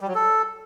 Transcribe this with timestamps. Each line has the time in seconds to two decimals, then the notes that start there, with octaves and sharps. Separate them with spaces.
0.01 G3
0.08 F#3
0.15 A4